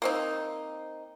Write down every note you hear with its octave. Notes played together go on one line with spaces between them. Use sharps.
A#3 C4 D#4